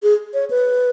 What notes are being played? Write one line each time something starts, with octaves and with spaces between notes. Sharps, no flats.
G#4
C#5
B4